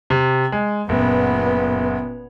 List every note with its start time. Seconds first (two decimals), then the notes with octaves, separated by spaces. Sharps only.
0.10 C3
0.52 G#3
0.89 F#1 A#2 B3